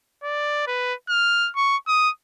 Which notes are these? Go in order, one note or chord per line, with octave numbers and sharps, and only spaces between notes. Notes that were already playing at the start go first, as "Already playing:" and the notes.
D5
B4
F6
C#6
D#6